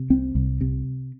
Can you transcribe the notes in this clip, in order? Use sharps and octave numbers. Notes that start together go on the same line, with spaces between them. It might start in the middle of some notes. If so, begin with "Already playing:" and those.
Already playing: C3
C2 C4
C2
C3